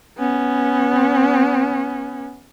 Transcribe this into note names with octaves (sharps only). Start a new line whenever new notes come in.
B3 C#4